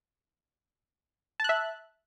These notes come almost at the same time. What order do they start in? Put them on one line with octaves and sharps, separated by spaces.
A5 F#6 E5